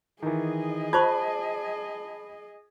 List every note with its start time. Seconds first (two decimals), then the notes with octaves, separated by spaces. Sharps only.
0.22 D#3 E3 G#4 D#5
0.93 F4 C5 A5 B5 C#6 G#6